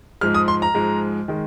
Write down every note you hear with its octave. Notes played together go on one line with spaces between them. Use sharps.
G#2 F3 G#3 F6
D#6
C6
A#5
G#2 F3 G#3
D#3 G#3